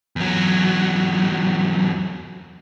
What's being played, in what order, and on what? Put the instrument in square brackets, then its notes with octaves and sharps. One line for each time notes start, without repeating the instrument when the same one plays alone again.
[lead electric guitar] E2 F#3